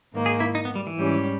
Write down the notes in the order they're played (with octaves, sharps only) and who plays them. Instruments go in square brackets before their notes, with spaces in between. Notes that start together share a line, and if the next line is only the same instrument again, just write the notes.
[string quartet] G#2 D#3 A#3
[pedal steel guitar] G#4
E4
D#4
B3
G3
E3
[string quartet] G#2 G3 C#4 G4